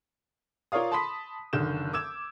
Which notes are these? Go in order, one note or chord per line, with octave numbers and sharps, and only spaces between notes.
F4 A#4 C#5 D5 F5 D#6
A5 B5 C6 D#6 B6
F#1 D3 D#3 G6 E7
D6 E6 G#6 E7